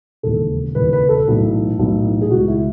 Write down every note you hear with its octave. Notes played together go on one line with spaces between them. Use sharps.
E1 D#2 C#3 E3 A4
E1 D#2 C#3 E3 B4
B4
A4
B1 A2 E3
B1 A2 E3
G#4
C#2 B2 F#4
E4